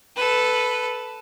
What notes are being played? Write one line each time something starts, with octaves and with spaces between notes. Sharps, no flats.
A4 B4